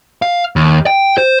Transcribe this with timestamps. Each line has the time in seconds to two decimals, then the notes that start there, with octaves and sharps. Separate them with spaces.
0.22 F5
0.56 D#2
0.86 G5
1.18 C5